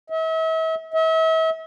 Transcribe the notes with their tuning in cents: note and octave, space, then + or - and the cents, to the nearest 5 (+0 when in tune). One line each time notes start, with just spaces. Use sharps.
E5 -40
E5 -40